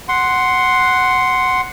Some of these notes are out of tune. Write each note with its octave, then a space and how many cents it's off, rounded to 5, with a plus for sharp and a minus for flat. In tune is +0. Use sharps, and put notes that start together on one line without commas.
F#5 +0 C6 +0